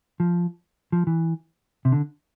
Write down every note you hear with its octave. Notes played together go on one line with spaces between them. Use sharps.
F3
F3
E3
C3
D3